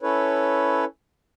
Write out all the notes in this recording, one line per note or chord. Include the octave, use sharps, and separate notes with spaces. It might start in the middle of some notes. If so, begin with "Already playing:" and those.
C#4 E4 A4 B4 C#5